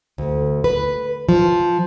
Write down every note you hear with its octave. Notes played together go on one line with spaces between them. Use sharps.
D2
B4
F3